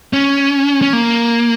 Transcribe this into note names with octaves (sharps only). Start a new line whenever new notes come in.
C#4
C#4
A#3